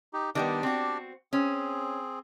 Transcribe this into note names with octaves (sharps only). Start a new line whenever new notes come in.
D#4 G4
D#3 G3 B3 D4 G4 D5
C4 F#4
C4 C#4 G#4